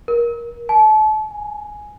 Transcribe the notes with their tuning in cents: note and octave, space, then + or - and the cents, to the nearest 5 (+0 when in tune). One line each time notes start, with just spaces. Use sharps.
A#4 +20
A5 -35
G#5 +5